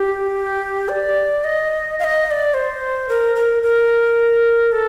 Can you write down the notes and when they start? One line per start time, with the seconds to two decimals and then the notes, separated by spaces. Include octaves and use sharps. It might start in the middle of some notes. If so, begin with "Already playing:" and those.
Already playing: G4
0.89 D5
1.44 D#5
1.99 F5
2.04 D#5
2.26 D#5
2.31 D5
2.54 C5
3.09 A#4
3.36 A#4
3.63 A#4
4.72 A4